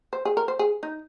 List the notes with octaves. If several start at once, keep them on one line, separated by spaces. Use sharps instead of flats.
C5
G#4
A#4
C5
G#4
D#4